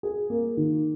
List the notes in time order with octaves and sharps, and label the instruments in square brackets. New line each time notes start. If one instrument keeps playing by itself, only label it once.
[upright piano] G#4
A#3
D#3